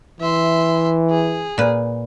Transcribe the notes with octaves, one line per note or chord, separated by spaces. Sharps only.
E3 E5 C6
G#4
A#2 B4